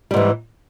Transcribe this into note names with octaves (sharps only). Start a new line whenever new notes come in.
G#2 E3 G3